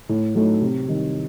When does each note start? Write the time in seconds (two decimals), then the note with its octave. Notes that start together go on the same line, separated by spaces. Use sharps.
0.09 A2
0.35 F#3 A3 D#4
0.61 C3
0.88 D#3 G3